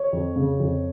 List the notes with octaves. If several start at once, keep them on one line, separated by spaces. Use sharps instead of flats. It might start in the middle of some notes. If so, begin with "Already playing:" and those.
Already playing: C#5
F2
C#3
F2